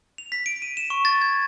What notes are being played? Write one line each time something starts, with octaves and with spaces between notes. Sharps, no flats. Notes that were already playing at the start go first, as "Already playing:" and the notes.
F7
B6
D7
D#7
E7
C#6
A6
G#6